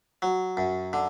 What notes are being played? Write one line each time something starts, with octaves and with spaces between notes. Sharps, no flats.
F#3
F#2
D3